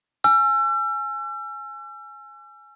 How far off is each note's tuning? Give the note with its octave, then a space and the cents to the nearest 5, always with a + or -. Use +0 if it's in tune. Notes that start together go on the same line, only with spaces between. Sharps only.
G#5 +5 E6 +40